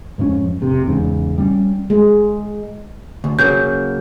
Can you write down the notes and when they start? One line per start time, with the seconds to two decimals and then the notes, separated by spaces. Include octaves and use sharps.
0.18 F2 G#2 F3 C#4
0.61 F1 C3
0.86 E2 G#2 C#3
1.38 G3 C#4
1.90 G#3
3.24 D2
3.39 C#3 F#3 A#3 G6